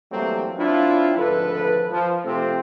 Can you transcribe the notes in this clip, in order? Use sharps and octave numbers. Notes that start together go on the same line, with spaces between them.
E3 F#3 G3 A3 A#3 C4
F#3 C4 D4 E4 F4
G#1 D2 F3 A4 B4
F3
C3 F3 A3 C4